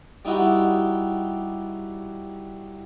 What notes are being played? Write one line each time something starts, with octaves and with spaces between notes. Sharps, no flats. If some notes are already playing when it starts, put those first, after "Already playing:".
G3 D#4 E4 F#4 G4